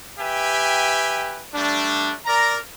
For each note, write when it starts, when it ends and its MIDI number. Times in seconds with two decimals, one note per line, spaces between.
0.19 1.44 67
0.19 1.44 71
0.19 1.44 76
0.19 1.44 79
0.19 1.44 80
1.55 2.15 55
1.55 2.15 57
1.55 2.15 62
2.26 2.58 70
2.26 2.58 74
2.26 2.58 82